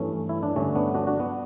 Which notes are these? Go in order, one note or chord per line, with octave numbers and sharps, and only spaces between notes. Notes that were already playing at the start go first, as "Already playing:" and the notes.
Already playing: G2 E3 A3 C#4
E4
D4
G2 D3 A3 C#4
B3 D4
D4 F#4
D4 F#4
B3